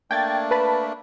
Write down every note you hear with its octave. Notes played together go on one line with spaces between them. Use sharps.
A3 A#3 D4 G5 G#6 A6
B4 A5 B5